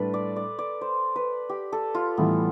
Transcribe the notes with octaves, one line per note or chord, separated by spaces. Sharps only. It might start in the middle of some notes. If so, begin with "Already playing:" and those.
Already playing: A2 G3 D4 A4 B4
D5
D5
D5
C5
B4
G4
A4
F4
A2 E3 G3 B3